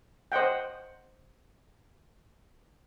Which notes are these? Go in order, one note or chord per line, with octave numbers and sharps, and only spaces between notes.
C5 D#5 F#5 G5